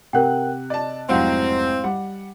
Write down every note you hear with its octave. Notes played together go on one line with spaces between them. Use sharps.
C3 A#4 F#5 G5 F#6
D5 D#5 A5
F1 G#2 F#3 C4 E4 F5 F#5
G3 F#5